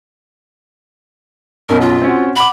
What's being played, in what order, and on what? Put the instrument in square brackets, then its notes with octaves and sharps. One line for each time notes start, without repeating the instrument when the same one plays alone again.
[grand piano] B1 F#2 B2 [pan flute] A#4
[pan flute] F4
[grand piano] C4 C#4 F#4
[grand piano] F#5 D6 [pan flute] B5